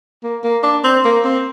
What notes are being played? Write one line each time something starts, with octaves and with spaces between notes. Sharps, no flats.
A#3
A#3
D4
C4
A#3
C4